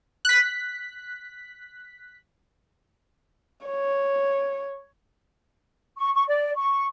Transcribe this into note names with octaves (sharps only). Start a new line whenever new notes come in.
F#6 B6
C#5
C#6
C#6
D5
C#6